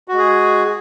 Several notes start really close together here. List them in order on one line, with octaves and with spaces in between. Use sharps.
F#4 G#3 G#4